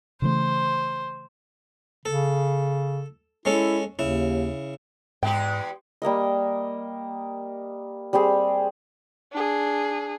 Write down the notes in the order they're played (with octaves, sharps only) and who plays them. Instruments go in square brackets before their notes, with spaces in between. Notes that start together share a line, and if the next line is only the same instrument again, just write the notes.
[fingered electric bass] C#3 E3 A3 [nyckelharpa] C5
[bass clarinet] C#3 [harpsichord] A4
[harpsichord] G#3 C#4 A4 [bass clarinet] E4
[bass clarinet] D#2 [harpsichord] C#3 E4
[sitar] E2 G#3 G4 [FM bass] G#2 [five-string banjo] G5
[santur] G3 A#3 A#4 D#5
G3 C4 G4 G#4
[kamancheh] D4 G#4